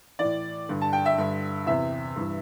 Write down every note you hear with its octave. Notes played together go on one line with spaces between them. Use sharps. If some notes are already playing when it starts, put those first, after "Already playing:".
A2 E3 D5
G2 D3
A5
G5
E5
G2 D3
E2 C3 E3 E5
G2 E3